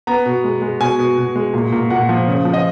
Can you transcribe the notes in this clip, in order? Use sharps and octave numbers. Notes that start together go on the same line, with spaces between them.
B3 A#5
B2
G#3
G#3
B2 G#5
B2
B2
G#3
A#2
A#2
A#2 F#5
F3
C#3
F3
D#5